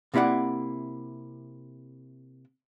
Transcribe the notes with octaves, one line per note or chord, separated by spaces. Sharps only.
C3 A#3 E4 D5 F#5